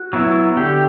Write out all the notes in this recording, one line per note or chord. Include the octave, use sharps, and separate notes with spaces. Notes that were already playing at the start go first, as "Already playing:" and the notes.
Already playing: F#4
F#3 B3 E4
D3 G4